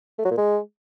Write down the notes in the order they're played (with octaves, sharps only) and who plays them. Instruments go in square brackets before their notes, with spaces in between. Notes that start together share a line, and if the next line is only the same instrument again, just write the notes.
[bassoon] A3
F#3
A#2
G#3